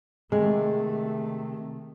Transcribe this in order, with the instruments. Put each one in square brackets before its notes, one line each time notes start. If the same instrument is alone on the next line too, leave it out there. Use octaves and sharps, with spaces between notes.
[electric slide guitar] C3 [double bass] D#3 A3 [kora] G#3